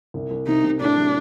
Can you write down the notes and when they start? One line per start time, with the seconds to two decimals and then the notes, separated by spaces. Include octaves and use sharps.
0.14 C2
0.31 C2
0.47 C3 D#4
0.64 C3
0.80 A2 D4
0.97 F#3